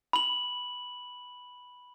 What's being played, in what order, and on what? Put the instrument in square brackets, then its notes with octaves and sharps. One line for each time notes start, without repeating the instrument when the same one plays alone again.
[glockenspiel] B5 F#7